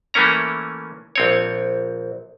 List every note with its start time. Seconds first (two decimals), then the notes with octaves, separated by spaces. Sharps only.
0.14 E3 A3 A#3 C#4 A#5
1.16 A#1 C4 C#5